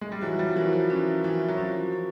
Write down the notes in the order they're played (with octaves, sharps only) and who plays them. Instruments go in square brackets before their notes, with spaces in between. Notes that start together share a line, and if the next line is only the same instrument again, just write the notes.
[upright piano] G#3
G3
[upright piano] E3 F#3 [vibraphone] F#4
[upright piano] F3 G3
[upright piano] E3 F#3 [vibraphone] A#4
[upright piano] F3
[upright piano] E3 [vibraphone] C#4
[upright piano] E3 [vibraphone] F#4
[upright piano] F#3
[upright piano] F3 [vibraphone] C#4
[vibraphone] C#4